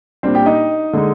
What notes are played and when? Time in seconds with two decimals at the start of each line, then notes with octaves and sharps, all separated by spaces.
0.23 A#2 G3 C4 D4 C5
0.35 G4 G5
0.46 D#4 D#5
0.93 D3 G#3 D#4